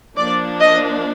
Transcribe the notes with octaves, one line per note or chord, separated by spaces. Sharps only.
F3 A#3 D4 D5
D#5